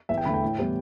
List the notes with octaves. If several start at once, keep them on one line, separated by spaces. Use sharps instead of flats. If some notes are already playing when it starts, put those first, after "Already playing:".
E2 E5
G5
D3 A3 B5
G5
A2
E3 G3 B3